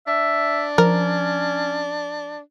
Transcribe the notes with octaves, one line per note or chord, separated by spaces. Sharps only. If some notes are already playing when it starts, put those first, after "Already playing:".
D4 E5
F3 C#4 A#4